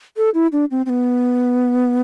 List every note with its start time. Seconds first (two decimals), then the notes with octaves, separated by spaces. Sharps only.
0.17 A4
0.34 E4
0.52 D4
0.71 C4
0.86 C4
0.90 B3